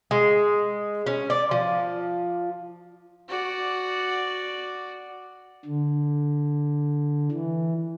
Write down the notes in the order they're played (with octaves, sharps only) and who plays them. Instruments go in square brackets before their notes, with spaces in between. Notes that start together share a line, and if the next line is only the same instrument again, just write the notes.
[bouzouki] G#3
C#4
D5
F3
[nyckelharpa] F#4 D5
[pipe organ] D3
E3